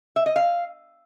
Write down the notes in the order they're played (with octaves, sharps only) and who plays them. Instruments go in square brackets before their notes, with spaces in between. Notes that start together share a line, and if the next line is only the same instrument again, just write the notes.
[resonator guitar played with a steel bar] E5
D#5
F5